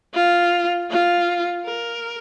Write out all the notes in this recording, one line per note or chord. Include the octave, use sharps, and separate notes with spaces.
F4
F4
A#4